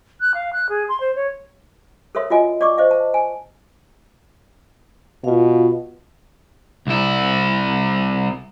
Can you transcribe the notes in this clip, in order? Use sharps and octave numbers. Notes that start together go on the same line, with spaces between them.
F#6
F5
F#6
G#4
C6
C5
C#5
A4 A#4 C#5 E5 C6
F4 F#4 D#5 G#5
D5 D#5 C#6 D6
C5 D#5 F5
A5
G#5
B2 F4 F5
C2 E4